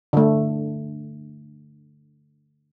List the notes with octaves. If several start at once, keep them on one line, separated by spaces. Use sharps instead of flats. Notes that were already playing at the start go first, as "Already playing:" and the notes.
D3 A3